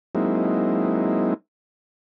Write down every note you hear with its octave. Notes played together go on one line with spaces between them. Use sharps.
F#3 G#3 A#3 C4 D#4 E4